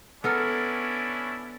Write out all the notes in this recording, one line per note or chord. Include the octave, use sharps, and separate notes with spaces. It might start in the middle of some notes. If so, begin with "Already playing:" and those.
B3 C#4 D4 E4 A4 A#4